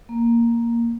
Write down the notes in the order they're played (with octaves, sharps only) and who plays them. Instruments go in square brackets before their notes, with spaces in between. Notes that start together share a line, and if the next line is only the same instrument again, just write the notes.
[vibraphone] A#3